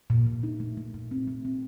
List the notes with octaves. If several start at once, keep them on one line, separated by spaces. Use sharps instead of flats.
A#2
A#2
D#4
A3
A3
A#2
C4
A3
C4